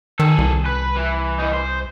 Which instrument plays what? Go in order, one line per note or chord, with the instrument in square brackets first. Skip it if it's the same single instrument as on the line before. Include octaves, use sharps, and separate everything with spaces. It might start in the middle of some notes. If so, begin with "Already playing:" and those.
[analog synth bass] D#3 [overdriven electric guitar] G#4 A4
[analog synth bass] C2
[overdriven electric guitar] B4
E3
E3 D#4
C5